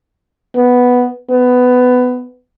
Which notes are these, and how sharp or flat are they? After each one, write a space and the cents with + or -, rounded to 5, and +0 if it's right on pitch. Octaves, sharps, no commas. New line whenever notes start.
B3 +0
B3 +15